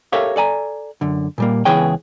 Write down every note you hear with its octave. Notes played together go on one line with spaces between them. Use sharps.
G4 A4 A#4 C#5 E5 F5
A4 D5 G#5 A#5
F#2 D3
A#2 G3 A#3
C#2 E3 B3 G#4 C#5 G5